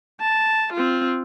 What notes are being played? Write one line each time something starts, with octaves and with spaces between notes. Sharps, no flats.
A5
C4 F4